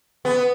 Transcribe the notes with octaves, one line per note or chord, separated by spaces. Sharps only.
B3